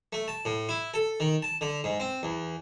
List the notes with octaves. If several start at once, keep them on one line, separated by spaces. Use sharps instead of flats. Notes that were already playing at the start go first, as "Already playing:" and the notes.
A3
A5
A2
E4
A4
D#3
A5
D3
G#2
C4
E2